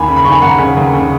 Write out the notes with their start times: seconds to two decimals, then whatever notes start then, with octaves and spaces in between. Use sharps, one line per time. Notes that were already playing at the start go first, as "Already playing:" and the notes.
Already playing: D#2 G#5 B5
0.08 C#3
0.16 B5
0.25 D#2 C#6
0.32 G#5 B5
0.42 D#2 F#5 A#5
0.58 C#3
0.77 D#2
0.94 C#3